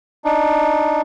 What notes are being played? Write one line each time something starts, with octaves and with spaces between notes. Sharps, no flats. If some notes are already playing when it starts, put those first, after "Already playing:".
D4 D#4